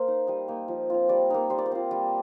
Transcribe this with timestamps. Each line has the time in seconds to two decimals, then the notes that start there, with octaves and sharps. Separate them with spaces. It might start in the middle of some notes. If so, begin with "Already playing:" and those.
Already playing: A#3 A#4 C5
0.08 D#4
0.27 G3 D#5
0.48 A#3 D#4
0.68 F3
0.90 C4 F4
1.09 G3 D5
1.30 A#3 D#4
1.50 G3 C5
1.58 D5
1.66 C5
1.72 C4 F4
1.91 G3